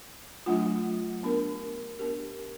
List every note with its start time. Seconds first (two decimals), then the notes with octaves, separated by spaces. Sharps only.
0.46 F#3 A3 D4 F4
1.23 B3 D4 G4 A#4
1.99 B3 D4 G4 A#4